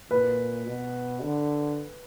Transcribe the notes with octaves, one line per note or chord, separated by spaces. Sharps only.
A#2 B4
B2
D3